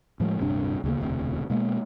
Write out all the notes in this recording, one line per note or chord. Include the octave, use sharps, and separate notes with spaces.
A2 F3 F#3 G#3
D1 G2 C3 D4
D2 C#3 A#3
E1 D2 A2 C3
B2 G#3 A#3